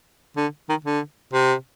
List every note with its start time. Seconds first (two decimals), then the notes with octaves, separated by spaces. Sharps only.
0.37 D3
0.69 D#3
0.85 D3
1.33 C3